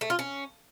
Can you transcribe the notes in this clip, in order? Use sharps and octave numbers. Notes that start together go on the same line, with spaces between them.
A3
F4
C#4